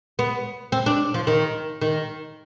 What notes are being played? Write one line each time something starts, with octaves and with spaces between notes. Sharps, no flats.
B3
C4
D4
F3
D#3
D#3